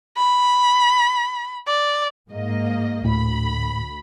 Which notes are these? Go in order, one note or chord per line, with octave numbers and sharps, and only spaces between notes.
B5
D5
G#2 A#3 D#5
D2 A2 B5